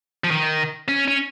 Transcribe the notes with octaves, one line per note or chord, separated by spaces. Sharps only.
F3
D#3
C#4
C#4